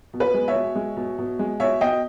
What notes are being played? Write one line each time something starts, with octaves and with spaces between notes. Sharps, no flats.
B2
B4
G#3
C#5 E5
B2
G#3
B2
B2
G#3
B2 C#5 E5
B2 D#5 G5